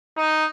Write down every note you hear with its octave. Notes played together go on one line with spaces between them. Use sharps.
D#4